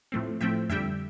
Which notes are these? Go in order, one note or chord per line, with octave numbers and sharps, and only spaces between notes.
A2 F3 A3 C4
A2 F3 A3 C4 E5 G5
F2 D3 G3 E5 G5